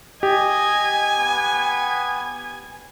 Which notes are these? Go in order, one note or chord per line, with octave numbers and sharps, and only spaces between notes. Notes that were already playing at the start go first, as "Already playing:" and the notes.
G4 D#5 G#5
B3